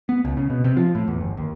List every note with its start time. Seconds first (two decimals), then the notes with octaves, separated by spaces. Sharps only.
0.09 B3
0.25 C#2
0.37 C#3
0.50 B2
0.64 C3
0.77 F3
0.95 A2
1.08 E2
1.21 G1
1.37 D#2